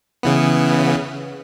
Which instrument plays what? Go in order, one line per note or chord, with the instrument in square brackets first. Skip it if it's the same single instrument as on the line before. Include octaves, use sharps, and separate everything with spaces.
[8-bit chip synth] C#3 E3 B3